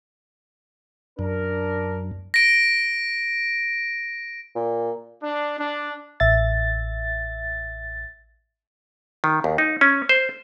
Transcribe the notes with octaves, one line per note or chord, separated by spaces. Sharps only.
F#2 D4 A#4
A#6 D7
A#2
D4
D4
A1 E5 A6
D#3
D#2
D#4
C#4
C5